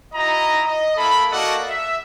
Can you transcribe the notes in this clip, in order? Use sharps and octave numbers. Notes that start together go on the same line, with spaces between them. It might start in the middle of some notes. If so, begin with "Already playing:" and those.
E4 F#4 D#5 A#5
D#5
A#3 E4 A4 B5
A#3 F#4 A4 D5 D#5 F#5
E5